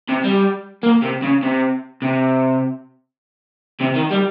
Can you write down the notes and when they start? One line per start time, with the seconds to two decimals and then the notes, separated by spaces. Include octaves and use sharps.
0.09 C3
0.24 G3
0.83 A#3
1.02 C3
1.23 C#3
1.43 C3
2.02 C3
3.81 C3
3.96 D#3
4.11 G3